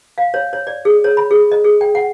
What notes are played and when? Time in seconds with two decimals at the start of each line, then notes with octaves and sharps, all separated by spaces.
0.18 F5
0.34 C#5
0.53 C#5
0.67 D5
0.85 G#4
1.04 C#5
1.17 B5
1.31 G#4
1.52 D#5
1.64 G#4
1.81 G5
1.95 F#5